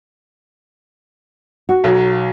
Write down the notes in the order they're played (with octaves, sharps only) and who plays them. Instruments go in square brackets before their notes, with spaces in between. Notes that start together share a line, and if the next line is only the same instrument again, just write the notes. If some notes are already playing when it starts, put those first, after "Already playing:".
[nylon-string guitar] F#4
[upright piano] B1 F#3